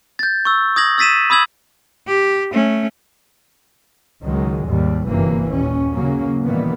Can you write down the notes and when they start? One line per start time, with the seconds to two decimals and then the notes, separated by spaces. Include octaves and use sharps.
0.19 G6 A6
0.45 C#6 E6
0.76 D#6 G#6 A#6 F#7
0.98 E6 A6 B6 D#7 E7
1.30 B5 D#6 E6 G#6 F#7
2.07 G4
2.52 A3 C#4
4.24 C#2 D#3 F#3 G#3
4.67 D#2 G#2 G3
5.06 G1 F#2 C3 E3 A#3
5.49 D#2 A#2 C#4
5.95 C#3 F#3 A#3 C#4
6.44 A#2 D#3 E3 G3 A#3 B3